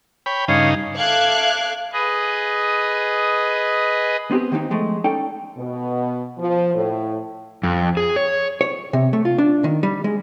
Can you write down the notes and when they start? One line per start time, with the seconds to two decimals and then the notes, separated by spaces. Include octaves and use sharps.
0.26 C#5 G5 B5
0.48 G2 C#3 D#4 C#5 F5
0.97 A4 E5 F5 D6 F#6 G#6
1.93 G#4 B4 D#5
4.31 B3 C4 F#4 G4 B4
4.52 D#3 A#3 C4 D4 D#4
4.70 F3 G#3 A3
5.04 C#4 D#4 A4 D5 G5
5.57 B2
6.38 F3
6.75 A2
7.63 F2
7.97 G#4
8.16 C#5
8.61 C#5
8.93 C3
9.13 A3
9.25 F4
9.38 D4
9.64 D#3
9.83 G3
10.04 G#3